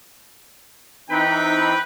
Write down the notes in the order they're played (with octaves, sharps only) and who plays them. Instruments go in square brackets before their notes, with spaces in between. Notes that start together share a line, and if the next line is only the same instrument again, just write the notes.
[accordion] E3 C4 D#4 [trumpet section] B4 G5 B5